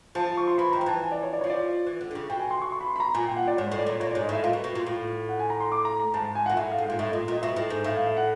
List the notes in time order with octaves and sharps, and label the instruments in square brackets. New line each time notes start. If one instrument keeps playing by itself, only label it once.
[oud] F3 [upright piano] A5
[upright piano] A5
C#6
C6
[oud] E3 [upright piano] B5
[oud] D#3 [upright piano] A#5
[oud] F3
[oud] E3 [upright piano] A5
[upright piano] G#5
D5
C#5
D5
[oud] F3 [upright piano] C#5
[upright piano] D5
[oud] E3
D3
D3
C#3
[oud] B2 [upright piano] G5
[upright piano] G#5
C6
C#6
C#6
B5
C6
B5
A#5
[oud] A#2 [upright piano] G#5
[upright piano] G5
F#5
D5
[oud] G#2 [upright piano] C#5
[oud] A2 [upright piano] C#5
[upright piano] D5
[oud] A#2 [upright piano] C#5
[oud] A#2 [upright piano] C#5
[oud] G#2 [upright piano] D5
[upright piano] D#5
[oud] A2 [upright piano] E5
[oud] A#2 [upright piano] F5
[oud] B2
B2
A#2
A2
[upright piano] F#5
G#5
A#5
C6
D6
A#5
A#5
[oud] G#2 [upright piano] A5
[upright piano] A5
G#5
[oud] A#2 [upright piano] F#5
[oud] A2 [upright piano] E5
[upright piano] F5
[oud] G#2
[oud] A#2 [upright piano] F5
[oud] A2 [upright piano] E5
[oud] A#2 [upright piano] D#5
[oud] A#2 [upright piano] D#5
[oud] B2 [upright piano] E5
[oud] A2
G#2
[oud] A2 [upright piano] E5
[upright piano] F5
E5
F#5